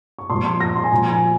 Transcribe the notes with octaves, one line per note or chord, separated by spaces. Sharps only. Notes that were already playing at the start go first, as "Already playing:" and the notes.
C#6
A#2 F3 C6
C6
A#6
C6
G#5
A#2 F3 A#5
G#5